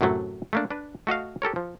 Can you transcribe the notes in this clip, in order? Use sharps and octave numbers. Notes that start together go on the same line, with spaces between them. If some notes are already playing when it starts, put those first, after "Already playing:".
F#2 A2 C3 F#3 A3
A3 A#3 D4
D4 B4
A3 F#4 D#5 F5
G4 A4 A#4 C#5
F3